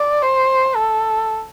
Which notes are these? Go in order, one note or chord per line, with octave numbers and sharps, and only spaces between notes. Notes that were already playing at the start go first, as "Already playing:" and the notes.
Already playing: D5
C5
A4